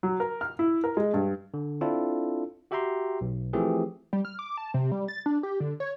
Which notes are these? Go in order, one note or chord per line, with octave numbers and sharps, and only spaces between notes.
F#3
A#4
F6
E4
A#4
G#3
G2
D3
C4 D4 E4 F4 A4
F#4 G4 E5 G5 A#5 C6
B1
E3 F3 A3 C4 G4 G#4
G3
F6
D6
A5
C3
G3
A6
D4
G4
D3
C#5